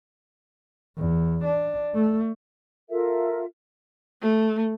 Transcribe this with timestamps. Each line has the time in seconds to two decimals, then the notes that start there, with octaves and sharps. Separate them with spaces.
0.97 E2
1.44 D4
1.94 A3
2.89 F4 A4 A#4 E5
4.22 A3